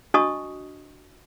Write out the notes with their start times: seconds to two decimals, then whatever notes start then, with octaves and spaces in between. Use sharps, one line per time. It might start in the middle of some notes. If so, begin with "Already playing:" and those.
0.14 D4 F#4 D#5 A5 C#6 D#6